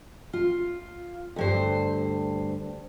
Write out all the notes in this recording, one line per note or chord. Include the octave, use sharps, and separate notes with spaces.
F4
D2 G2 C5